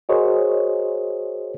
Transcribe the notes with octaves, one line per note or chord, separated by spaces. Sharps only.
F#4 G#4 A#4 C5 C#5 D#5